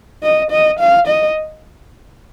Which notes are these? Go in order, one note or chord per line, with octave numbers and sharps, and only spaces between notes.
D#5
D#5
F5
D#5